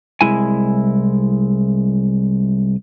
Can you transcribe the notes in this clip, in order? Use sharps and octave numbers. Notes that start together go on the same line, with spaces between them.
C2 G#3 E4 G#5